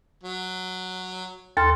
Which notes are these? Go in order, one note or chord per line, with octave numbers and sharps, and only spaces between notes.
F#3
D#2 A4 C6 F6